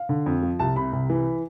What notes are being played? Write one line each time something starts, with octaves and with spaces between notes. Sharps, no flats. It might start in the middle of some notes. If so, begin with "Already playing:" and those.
Already playing: F5
D3
F2
F3
C2 A5
C3 B5
C2
E3